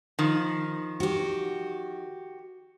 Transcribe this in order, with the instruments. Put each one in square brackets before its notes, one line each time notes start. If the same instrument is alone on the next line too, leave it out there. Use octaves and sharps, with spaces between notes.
[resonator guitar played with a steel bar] D#3 F3
[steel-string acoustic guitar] F#4 G4